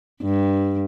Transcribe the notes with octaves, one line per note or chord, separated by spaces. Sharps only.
G2